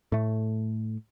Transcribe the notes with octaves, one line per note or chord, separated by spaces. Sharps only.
A2 A3